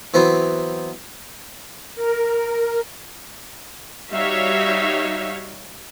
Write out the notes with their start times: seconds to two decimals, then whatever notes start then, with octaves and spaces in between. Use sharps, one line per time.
0.14 E3 F#3 B3 C4
1.95 A#4
4.12 G3 D#4 F#4 C#5 E5 F5